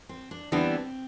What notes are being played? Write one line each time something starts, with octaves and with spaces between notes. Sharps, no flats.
C4
D4
E3 G3 B3 C4 D4